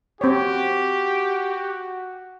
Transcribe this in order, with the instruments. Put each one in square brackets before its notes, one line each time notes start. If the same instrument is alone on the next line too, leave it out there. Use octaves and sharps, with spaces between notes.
[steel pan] C4 C#5 [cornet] F#4 [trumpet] G4